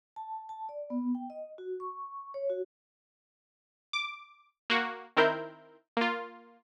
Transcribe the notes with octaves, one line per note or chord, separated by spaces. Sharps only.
A5
A5
D5
B3
G5
D#5
F#4
C#6
C#5
F#4
D6
A#3 F#4
D#3 C4 E4 A#4 G6
A#3 F4